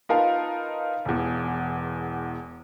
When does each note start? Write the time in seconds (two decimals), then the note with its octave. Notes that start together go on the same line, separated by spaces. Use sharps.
0.09 D#4 F4 A#4 B4 F5 A5
1.05 E1 E2